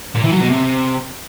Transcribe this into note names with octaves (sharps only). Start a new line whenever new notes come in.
A#2
E3
F#3
B2
C3